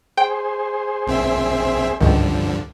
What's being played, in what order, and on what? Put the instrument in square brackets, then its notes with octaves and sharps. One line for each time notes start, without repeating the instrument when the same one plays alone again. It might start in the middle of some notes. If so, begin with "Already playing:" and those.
[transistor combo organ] G#4 C5 [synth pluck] G5
[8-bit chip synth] A#1 C4 E5
[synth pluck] G#1 C#2 [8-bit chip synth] G2 D3 F3